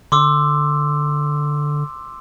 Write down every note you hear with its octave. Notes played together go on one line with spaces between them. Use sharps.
D3 C6 D6 E6